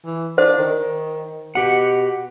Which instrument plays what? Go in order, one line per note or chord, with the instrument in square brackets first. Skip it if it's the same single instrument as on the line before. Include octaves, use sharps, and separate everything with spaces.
[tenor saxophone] E3
[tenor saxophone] D4 [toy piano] C5
[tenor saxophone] D#3
[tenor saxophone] B2 [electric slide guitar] G4 F#5